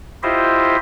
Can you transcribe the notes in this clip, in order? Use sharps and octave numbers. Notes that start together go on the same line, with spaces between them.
E4 F4 G4 C5 D#5 E5